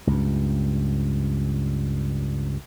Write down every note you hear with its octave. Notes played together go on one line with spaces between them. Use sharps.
C#2 G2